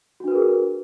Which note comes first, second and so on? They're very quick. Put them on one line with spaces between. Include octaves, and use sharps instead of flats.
F#4 D4 B4 A#4 G#4